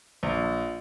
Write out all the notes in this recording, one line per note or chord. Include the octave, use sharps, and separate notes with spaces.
A#1